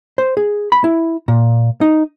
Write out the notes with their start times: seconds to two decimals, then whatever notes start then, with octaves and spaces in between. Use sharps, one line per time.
0.18 C5
0.37 G#4
0.72 B5
0.84 E4
1.28 A#2
1.81 D#4